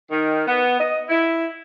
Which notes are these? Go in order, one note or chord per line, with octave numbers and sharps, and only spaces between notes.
D#3
B3
D#5
E4